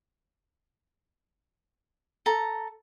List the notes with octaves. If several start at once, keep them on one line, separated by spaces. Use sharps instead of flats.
A4 A#5